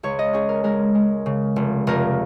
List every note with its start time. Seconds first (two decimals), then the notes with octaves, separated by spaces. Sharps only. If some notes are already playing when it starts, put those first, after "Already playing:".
0.03 C#2 C#5
0.19 D#5
0.33 C#4 G#4
0.49 A#4
0.64 G#3 A#4
0.95 G#3
1.26 C#3
1.56 F1
1.87 F1 A#4